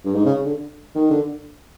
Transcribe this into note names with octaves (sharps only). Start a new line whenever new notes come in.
G2
G#2
C#3
D3
D#3
D3